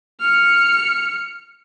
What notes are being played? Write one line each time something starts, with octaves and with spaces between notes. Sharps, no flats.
F6 C#7